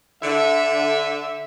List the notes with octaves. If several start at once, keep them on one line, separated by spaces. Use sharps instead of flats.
D3 E5